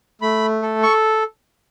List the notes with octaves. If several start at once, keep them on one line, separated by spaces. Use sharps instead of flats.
A3 B5
A4
C#6